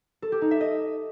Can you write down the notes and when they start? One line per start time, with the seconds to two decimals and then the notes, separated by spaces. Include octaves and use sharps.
0.22 A4
0.32 G4
0.42 D#4
0.51 E5
0.61 D#5